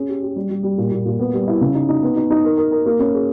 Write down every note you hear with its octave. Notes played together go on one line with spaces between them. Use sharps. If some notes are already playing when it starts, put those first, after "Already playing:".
Already playing: C#4 G#4
G4
G4
G3
G3
G3
A#2
A#2
A#2
B3
G3
E4
C#3
D#4
D#4
B3
D#4
D#4
A#4
A#4
A#4
A#3
C#4
G#4